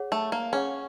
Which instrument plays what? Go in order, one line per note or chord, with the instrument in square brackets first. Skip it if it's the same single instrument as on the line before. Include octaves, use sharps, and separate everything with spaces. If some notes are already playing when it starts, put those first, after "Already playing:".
Already playing: [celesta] G#4 C#5 F#5
[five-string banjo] A3
A#3
[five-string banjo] C#4 [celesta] G#4 C#5 F#5